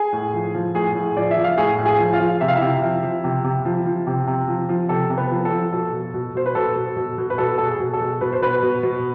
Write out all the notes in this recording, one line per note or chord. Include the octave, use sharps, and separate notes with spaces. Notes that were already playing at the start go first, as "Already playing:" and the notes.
Already playing: G#4 G#5
A2
F3
F3
A2 G#4 G#5
A2
F3 D5
E5
F3
F5
A2 G#4 G#5
A2
G#4 G#5
F3
F4 F5
F3
C3 E5
F5
E4 E5
C3
F3
F3
C3
C3
F3
F3
C3
C3
F3
F3
C3 A4
C3
B3 B4
F3
A4
F3
B2 A4
B2
B2
B2 C5
B4
B2 A4
B2
B2
B2
B4
B2 A4
B2 A4
G#4
B2
A4
B2
B2 B4
C5
B2 B3 B4
B2
B2